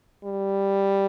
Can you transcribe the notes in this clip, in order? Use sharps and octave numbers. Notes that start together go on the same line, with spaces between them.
G3